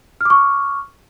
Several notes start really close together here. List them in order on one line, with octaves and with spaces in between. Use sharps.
F6 D6 C#6